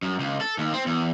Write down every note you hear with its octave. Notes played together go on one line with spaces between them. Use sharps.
F#2
C#2
A4
D#2
C4
E2